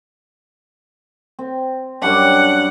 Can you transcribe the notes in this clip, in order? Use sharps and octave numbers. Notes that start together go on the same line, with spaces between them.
C4
F#2 G3 D4 F#5